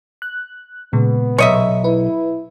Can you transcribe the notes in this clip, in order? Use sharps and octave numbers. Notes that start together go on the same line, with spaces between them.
F#6
A#2 C#3 G#3 B3
B1 C#5 D#5 E5
E4 B4